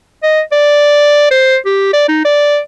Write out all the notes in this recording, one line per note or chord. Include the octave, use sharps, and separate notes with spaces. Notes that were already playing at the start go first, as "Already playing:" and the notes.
D#5
D5
C5
G4
D5
D#4
D5